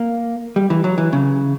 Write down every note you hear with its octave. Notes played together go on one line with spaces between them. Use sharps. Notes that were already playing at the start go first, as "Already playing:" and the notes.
Already playing: A#3
G3
E3
F#3
E3
C#3